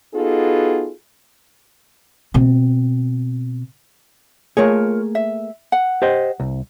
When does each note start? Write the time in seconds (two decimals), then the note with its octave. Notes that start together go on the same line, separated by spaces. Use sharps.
0.15 B3 D#4 F4 F#4 G#4 A4
2.34 B2 C4
4.57 A3 A#3 F4 G#4 A#4 C#5
5.15 E5
5.72 F#5
6.02 G4 C5 D#5
6.40 C2